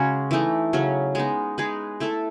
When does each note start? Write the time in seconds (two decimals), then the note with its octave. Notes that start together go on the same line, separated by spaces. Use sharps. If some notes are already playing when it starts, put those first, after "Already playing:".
Already playing: C#3 G#3 C#4 F#4 G#4
0.31 E3 A3 D#4
0.73 C#3 F#3 C#4
1.15 G#3 B3 D#4
1.58 G#3 D#4 G#4 B4
2.00 A3 E4 A4